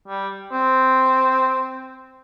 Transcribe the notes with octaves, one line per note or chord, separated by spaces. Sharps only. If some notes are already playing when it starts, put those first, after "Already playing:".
G3
C4